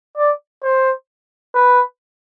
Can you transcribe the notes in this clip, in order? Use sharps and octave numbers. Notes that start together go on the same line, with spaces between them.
D5
C5
B4